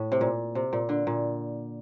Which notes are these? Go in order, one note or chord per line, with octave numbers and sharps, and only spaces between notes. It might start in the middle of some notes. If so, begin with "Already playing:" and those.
Already playing: A2
C3
A#2
C3
A#2
D3
A#2